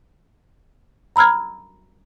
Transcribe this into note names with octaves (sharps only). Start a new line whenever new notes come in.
A#5 B5 E6 F6 G#6